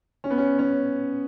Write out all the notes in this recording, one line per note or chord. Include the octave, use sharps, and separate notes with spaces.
C#4
B3
C#4
C#4